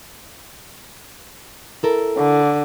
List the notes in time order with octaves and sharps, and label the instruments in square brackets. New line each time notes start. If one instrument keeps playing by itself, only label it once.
[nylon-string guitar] E4 A4 A#4
[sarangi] D3